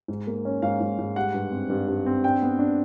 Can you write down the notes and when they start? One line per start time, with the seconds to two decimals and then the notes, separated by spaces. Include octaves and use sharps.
0.08 G#2
0.27 A#3
0.45 C#4
0.62 G#2 F5
0.81 G#2
0.99 G#2
1.16 G3 F#5
1.34 G2
1.51 C4
1.70 G2
1.88 G2
2.06 C4
2.24 D4 G5
2.42 B3
2.59 D4